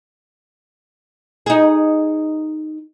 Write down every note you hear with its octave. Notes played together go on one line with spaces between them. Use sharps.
D#4 G#4